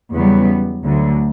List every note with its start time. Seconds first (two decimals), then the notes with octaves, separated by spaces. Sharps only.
0.13 E2 C#3 F#3 G3 B3
0.84 D2 D3 F#3